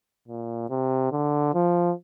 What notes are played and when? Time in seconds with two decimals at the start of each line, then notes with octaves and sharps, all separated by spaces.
0.28 A#2
0.70 C3
1.12 D3
1.54 F3